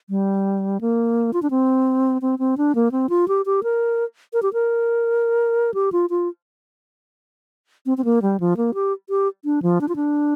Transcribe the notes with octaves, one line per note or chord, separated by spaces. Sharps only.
G3
A#3
F4
D4
C4
C4
C4
D4
A#3
C4
F4
G4
G4
A#4
A#4
G4
A#4
G4
F4
F4
C4
C4
A#3
G3
F3
A#3
G4
G4
D4
F3
D4
F4
D4